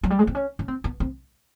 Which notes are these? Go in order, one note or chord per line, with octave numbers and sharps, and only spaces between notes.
F#3
G3
G#3
C4
C#4
C#4
C4
B3
C4